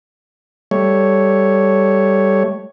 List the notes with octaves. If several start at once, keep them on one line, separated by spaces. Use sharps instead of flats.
G3 A3 C#5